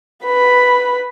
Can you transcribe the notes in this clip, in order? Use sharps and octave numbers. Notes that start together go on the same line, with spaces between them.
B4 B5